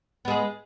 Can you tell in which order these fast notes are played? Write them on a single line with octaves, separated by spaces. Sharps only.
B3 G#3 G#4